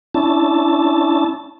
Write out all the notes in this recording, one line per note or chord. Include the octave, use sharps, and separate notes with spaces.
C#4 D4 E4 A5